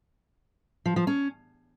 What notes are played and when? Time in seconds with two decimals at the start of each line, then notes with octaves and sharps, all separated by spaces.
0.85 F3
0.96 F3
1.07 C#4